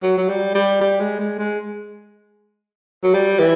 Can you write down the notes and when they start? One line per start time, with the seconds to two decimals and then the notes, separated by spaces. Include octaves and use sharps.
0.03 F#3
0.18 F#3
0.29 G3
0.55 G3
0.81 G3
1.00 G#3
1.20 G#3
1.39 G#3
3.04 F#3
3.14 G3
3.40 E3